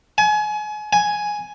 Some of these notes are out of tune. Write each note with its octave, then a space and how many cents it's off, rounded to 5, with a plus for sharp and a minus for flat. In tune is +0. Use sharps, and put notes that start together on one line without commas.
G#5 +30
G#5 +5